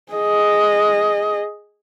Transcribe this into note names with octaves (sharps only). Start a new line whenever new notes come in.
G#4 D#5